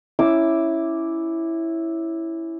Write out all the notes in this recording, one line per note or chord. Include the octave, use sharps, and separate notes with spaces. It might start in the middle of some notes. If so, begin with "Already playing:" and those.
C#4 E4 D6 E6